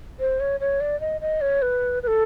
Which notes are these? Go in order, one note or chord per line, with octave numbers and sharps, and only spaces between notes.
C5
C#5
C#5
D5
D#5
D#5
C#5
B4
B4
A4